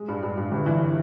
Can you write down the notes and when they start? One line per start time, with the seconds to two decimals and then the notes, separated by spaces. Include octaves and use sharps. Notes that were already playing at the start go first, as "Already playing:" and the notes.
Already playing: G#3
0.08 G2
0.23 G2
0.37 G2
0.52 G1
0.66 E3